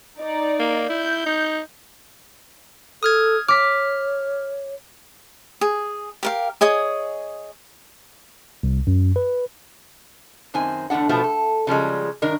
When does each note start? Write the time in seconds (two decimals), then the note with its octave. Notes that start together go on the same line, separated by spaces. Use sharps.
0.19 D#4 D5
0.59 A#3
0.89 E4 G6
1.26 D#4
3.03 A4 D#6 F6 G#6
3.48 C#5 D6 F6 B6
5.61 G#4
6.23 G4 A#4 F5
6.61 G#4 C#5 D#5 D#6
8.63 C2
8.87 F#2
9.16 B4
10.54 F#2 D#3 C4 G#5
10.90 E2 D3 A3 D4 F#5
11.09 B2 F3 A3 B3
11.24 A4
11.67 C#3 F3 G3 G#3
12.22 G2 D#3 D4 A#4